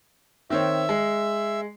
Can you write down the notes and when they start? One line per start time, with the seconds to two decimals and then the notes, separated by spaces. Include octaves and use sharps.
0.50 D#3 C4 C#5 E5
0.89 G#3